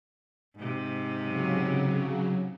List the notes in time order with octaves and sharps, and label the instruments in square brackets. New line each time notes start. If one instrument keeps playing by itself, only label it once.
[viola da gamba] G#2 C3
[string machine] C#3 F#3